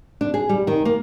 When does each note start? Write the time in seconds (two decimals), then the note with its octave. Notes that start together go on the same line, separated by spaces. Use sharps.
0.21 D4
0.34 G#4
0.49 G3
0.67 D#3
0.85 A#3